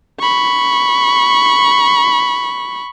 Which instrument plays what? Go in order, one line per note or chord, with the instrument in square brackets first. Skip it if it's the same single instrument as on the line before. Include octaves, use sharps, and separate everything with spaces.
[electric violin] B5 C#6